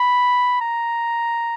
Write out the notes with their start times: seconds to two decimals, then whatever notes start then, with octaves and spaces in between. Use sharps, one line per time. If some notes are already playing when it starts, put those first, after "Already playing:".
Already playing: B5
0.61 A#5